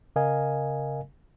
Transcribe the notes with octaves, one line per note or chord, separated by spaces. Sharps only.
C#3 A#4 D#5 F5 G#5